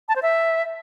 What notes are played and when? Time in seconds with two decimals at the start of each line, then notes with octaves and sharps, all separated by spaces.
0.09 A5
0.16 C5
0.22 E5